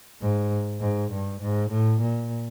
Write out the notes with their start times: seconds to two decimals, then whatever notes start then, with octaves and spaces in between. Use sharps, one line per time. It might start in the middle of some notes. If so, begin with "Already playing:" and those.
0.21 G#2
0.80 G#2
1.11 G2
1.41 G#2
1.70 A2
2.01 A#2